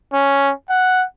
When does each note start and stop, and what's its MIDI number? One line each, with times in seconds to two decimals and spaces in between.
0.13 0.52 61
0.70 1.04 78